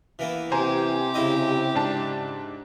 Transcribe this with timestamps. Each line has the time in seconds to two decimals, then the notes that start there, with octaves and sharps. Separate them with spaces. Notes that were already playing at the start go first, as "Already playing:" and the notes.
0.19 E3 A#3 B3
0.52 C3 G4 C5 G#5 A#5
1.14 C#3 E4 D#5
1.75 G#2 D4 A5